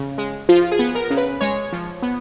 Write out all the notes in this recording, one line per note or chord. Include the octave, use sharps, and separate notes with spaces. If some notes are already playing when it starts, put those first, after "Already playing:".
Already playing: C#3
G#3
F3 F4
G#4
B3
A#4
C#3
B4
G#3 C#5
F3
B3